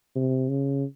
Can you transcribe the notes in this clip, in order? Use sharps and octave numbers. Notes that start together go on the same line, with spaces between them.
C3
C#3